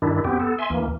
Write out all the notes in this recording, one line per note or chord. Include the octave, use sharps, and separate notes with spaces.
G2 D#3 D4 E4
F#2 B3 C4 G4
B3 A4
E5 G#5 C6
D2 E3 A#3